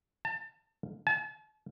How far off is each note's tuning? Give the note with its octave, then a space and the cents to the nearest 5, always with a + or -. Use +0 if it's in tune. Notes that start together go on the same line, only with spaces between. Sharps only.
A5 +30
A5 -40